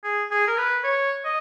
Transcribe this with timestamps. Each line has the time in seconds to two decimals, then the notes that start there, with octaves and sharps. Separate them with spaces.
0.04 G#4
0.31 G#4
0.47 A#4
0.58 B4
0.84 C#5
1.25 D#5